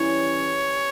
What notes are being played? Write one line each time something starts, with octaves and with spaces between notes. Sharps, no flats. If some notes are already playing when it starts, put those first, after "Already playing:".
Already playing: E3 G3 C#4 C#5